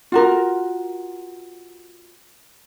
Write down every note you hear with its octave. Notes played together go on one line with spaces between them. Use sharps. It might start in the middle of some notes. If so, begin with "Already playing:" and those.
F4 F#4 A#4